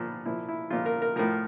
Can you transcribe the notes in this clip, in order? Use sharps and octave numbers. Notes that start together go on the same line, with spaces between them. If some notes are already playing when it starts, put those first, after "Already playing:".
Already playing: A#2 F3
A#2 F3 E4
E4
A#2 F3 F4
A#4
A#4
A2 F3 A#4